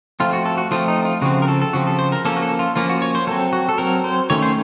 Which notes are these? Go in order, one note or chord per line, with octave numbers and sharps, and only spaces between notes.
F3 A3 C4 F4
F#4
A4
F#4
F3 A3 C4 F4
D#4
F4
C#3 F3 C4 F#4
A#4
A4
A4
C#3 F3 C4 F#4
A4
C5
A#4
F3 A#3 C#4 A4
F#4
A4
F4
F3 A#3 C#4 F4
F#4
C#5
C5
F#3 C4 A4
F#4
A4
F#3 C4 A#4
C5
D#3 A3 C#4 C#5
C5